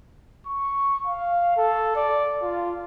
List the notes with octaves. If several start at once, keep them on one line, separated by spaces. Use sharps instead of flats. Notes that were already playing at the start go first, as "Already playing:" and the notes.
C#6
F5
A4
D5
F4